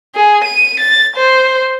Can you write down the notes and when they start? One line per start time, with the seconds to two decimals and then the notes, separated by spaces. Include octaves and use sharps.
0.15 G#4
0.44 D#7
0.80 A6
1.16 C5